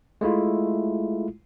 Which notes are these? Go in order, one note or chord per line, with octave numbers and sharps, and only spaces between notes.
G#3 A3 E4 F4